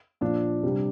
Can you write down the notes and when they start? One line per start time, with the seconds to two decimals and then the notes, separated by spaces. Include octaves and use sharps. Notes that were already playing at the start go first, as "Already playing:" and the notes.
0.21 A#2 F3 D4
0.63 C3 G3